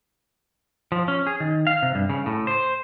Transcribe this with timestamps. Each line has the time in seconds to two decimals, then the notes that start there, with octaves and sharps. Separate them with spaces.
0.92 F3
1.08 C#4
1.27 G#4
1.40 D#3
1.67 F5
1.82 C3
1.95 G2
2.10 C#3
2.26 A2
2.47 C5